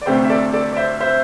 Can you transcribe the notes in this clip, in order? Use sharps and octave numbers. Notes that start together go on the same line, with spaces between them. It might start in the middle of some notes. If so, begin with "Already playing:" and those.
D5
D2 C3 A3 C4 G4 C5
E5
A4 D5
A4 D5
D5
C5 E5
C5 E5